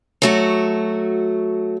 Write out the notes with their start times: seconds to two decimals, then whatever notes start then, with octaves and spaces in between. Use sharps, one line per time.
0.22 F#3 A3 F#4